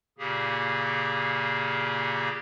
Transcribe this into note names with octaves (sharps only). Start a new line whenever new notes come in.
A#2 C#3 A#3 G4 G#4